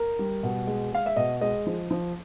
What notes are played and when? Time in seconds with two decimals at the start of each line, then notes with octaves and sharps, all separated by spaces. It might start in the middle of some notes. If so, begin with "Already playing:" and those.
Already playing: A#4
0.19 G3
0.43 B2
0.67 G#3
0.92 G#3 F5
1.06 E5
1.16 B2 D#5
1.41 G#3 D#5
1.67 F3
1.91 F3